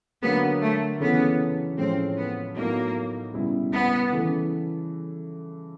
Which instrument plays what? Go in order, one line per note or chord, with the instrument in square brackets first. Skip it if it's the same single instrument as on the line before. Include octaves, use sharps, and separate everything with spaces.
[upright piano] D3 F#3 A#3 [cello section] B3
[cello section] A3
[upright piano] F#2 C#3 E3 A3 C#4 [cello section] B3
[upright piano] A2 F3 G#3 C#4 [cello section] C4
[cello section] B3
[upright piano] A2 F#3 B3 D#4 F#4 [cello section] A#3
[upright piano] C#2 B2 G3 B3 E4
[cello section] B3
[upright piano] C#3 E3 A3